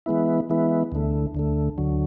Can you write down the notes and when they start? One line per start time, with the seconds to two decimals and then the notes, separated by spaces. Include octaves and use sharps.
0.06 E3 G#3 B3 E4
0.50 E3 G#3 B3 E4
0.92 D2 D3 A3
1.35 D2 D3 A3
1.78 D2 D3 F#3